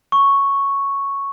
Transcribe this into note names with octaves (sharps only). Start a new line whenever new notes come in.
C#6